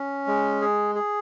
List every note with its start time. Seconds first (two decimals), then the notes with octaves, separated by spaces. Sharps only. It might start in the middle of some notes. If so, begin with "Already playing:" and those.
Already playing: C#4
0.27 G#3
0.61 G#4
0.95 G#4